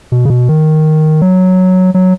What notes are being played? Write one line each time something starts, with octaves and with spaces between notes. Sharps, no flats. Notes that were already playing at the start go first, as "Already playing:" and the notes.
B2
C#3
B2
D#3
F#3
F#3